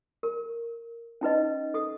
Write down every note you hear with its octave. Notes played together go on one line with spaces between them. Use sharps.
A#4
C#4 D#4 B4 D#5
A4 D#6